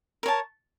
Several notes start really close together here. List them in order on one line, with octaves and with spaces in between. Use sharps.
A#4 C#5 A5